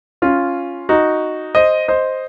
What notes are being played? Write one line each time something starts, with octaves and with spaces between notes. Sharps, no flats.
C#4 F4
D#4 F#4
C5 D#5
C5 D#5